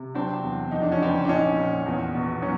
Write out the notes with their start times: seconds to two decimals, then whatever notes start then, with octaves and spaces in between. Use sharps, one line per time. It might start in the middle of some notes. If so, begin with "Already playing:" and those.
Already playing: C3
0.14 F#3 C4 D4
0.43 E2
0.71 F2 D#4
0.81 D4
0.92 C#4
1.00 C#3 C4 D4
1.25 D4
1.28 A#1 C#4 D#4
1.57 A#2
1.86 E2
2.15 B2
2.42 F#3 C#4